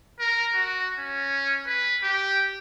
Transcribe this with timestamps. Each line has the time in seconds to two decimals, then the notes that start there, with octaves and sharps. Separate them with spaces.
0.20 A#4
0.55 F#4
0.99 C#4
1.66 B4
2.03 G4